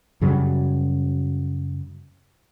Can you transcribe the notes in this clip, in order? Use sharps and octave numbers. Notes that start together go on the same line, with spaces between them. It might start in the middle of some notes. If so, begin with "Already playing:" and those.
F#2 C#3 F#3 G3